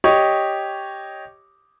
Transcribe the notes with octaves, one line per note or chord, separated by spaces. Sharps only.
G4 C#5 D#5 C#6